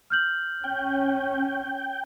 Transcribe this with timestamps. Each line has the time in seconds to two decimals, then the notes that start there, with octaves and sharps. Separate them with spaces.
0.10 F6 G6 F#7
0.64 C#4 G5